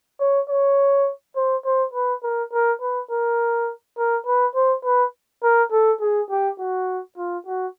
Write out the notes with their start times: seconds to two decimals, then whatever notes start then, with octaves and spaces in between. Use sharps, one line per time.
0.20 C#5
0.49 C#5
1.36 C5
1.65 C5
1.94 B4
2.23 A#4
2.53 A#4
2.82 B4
3.11 A#4
3.98 A#4
4.26 B4
4.56 C5
4.84 B4
5.43 A#4
5.72 A4
6.01 G#4
6.31 G4
6.59 F#4
7.17 F4
7.46 F#4